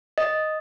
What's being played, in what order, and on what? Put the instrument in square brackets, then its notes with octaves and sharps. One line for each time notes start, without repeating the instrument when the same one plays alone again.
[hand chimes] D#5